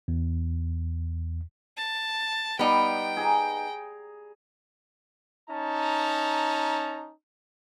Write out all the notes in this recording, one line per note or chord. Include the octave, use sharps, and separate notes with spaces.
E2
A5
G3 B3 D#4 G5
G#4 A#5
C#4 D#4 A5 A#5